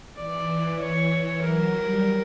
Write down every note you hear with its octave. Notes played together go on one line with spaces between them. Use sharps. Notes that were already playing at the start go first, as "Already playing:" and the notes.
E3 D5
C#5
F#3 A#4
G3